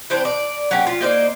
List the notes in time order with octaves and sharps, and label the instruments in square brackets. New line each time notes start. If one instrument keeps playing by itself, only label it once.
[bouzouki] E3 C4 D4 C5
D5
F#3 A#3 C#4 G4
F4
A#3 D#4 C5 D5